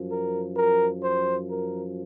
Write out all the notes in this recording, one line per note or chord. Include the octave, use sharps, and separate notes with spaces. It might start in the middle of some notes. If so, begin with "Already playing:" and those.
Already playing: F#2 F3
A#4
A#4
C5
A#4